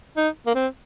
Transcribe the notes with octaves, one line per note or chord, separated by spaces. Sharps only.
D#4
A#3
C4